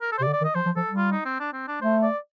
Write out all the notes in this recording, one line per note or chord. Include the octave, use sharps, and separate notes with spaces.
A#4
A4
C3 C5
D5
D3
D5
D#3
D#5
F3 C5
F3
F3 A4
G3
F4
D#4
C4
D4
C4
D4
A3 C5
D5